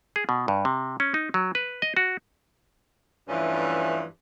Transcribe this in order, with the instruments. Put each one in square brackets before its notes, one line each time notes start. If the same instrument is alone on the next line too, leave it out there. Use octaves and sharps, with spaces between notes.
[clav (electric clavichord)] G#4
B2
G2
C3
C#4
D#4
F#3
B4
D#5
F#4
[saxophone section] G2 E3 F3 A3 C#4